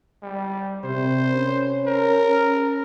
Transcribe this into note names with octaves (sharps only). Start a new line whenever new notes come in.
G3
C3 C5
C#4
A#4